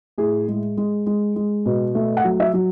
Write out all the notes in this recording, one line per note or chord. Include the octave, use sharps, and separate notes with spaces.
A2 G#4
G#3
G#3
G#3
G#3
B2
A3
F#5
F#3
E5
F#3